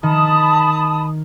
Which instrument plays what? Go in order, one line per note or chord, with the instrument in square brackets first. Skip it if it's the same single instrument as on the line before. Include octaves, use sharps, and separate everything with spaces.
[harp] D#3 [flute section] A5 B5 D#6